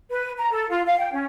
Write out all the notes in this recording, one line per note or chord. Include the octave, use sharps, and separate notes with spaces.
B4
A#5
A4
F4
F5
G5
C#4